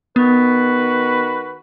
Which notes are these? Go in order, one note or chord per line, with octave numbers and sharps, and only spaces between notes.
D#3 B3 F#4 B4